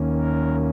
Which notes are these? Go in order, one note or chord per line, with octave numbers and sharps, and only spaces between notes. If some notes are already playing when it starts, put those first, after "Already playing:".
Already playing: D#2 D#3 A#3 C#4
A#4